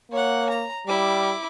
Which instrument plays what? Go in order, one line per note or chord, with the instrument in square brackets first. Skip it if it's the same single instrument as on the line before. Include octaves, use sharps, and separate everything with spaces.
[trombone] A#3 [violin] C#5 F#5
[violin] A#5
[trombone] G3 [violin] E4 D6